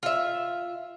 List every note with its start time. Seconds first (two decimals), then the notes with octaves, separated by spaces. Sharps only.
0.03 F4 E5